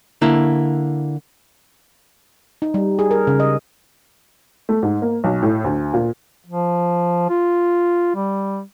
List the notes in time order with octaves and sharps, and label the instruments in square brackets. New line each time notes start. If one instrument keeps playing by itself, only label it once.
[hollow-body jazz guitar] D3 A#3 E4
[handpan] D#4
G3
G#4
A#4
C#3
D#5
[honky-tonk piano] A3
G#2
A#3
B1
A2
D2
A#2
[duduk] F3
F4
G3